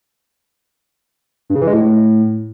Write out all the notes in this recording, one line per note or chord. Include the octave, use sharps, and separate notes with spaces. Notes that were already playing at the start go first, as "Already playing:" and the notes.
G2
C#3
E3
G#3
A2